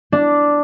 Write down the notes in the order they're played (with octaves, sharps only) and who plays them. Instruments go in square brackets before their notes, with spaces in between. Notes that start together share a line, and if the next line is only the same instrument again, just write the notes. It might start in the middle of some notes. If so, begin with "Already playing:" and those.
[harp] D4